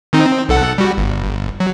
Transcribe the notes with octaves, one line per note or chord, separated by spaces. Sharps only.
D#3 C4 D#4
C4
B1 A4 F#5
G3 F#4
G1
F#3